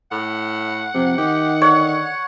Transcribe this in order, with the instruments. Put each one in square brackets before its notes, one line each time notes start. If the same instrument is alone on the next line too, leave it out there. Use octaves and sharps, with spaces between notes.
[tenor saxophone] A2 [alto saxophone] F#5
[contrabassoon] F2 [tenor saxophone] C3
[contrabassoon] D#3 [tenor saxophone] G4
[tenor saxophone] D3 [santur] C#5